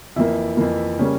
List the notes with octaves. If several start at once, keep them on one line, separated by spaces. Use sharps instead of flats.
F2 E3 A#3 E4
F2 E3 A#3
C#3 G3 A#3 C#4